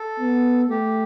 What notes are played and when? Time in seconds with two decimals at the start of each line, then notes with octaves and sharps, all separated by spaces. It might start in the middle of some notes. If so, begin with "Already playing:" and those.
Already playing: A4
0.19 B3
0.69 A3 G4